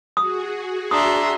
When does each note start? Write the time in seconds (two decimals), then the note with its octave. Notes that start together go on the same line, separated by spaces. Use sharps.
0.17 F#4 G#4 D#6
0.91 D4 E5 A#5 C6 D#6